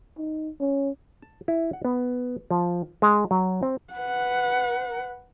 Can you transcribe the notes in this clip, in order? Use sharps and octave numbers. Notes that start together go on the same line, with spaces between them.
D#4
C#4
A5
E4
F#5
B3
F3
G#3
F#3
C4
B4 F#5